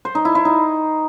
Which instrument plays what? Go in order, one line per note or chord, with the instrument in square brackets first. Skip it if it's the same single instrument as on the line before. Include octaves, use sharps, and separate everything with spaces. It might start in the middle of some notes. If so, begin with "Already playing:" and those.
[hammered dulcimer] C5
D#4
E4
E4
D#4